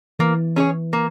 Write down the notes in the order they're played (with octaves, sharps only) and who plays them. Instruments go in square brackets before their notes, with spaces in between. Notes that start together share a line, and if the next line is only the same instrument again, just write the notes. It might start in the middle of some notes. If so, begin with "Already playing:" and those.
[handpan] E3 [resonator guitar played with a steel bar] A#3
[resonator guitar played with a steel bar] C#4 G#4 C#5
A#3